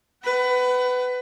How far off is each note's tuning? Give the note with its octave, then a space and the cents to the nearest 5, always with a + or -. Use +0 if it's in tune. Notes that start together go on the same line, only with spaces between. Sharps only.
B4 +20 F#5 +35